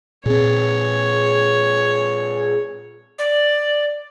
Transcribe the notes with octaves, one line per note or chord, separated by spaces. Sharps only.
A#2 C4 G#4 C#5
D5